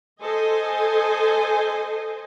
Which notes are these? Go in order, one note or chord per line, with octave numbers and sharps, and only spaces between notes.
A4 C5 D#5 G#5